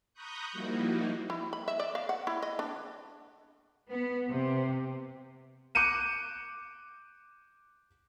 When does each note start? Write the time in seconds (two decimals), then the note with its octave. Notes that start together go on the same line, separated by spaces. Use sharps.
0.14 A#5 B5 C#6 D#6 F#6 G6
0.52 F3 G3 A#3 D#4 E4 F#4
1.30 E4
1.53 B5
1.68 E5
1.80 D5
1.95 F5
2.09 F#5
2.27 E4
2.42 D#5
2.59 D4
3.90 B3
4.29 C3
5.75 D6 F#6 G6 C#7 D#7 E7